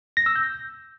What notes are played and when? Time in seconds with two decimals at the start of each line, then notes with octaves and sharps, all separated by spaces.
0.17 A#6
0.26 E6
0.36 G6